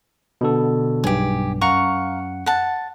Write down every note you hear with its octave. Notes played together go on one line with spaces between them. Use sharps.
B2 D3 A4
B1 G2 G4 G#4
F#2 F5 F#5 A#5 C#6 C#7
F#5 A5